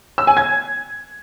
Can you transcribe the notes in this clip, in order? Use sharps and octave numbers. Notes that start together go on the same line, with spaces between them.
E6
G#5
G#6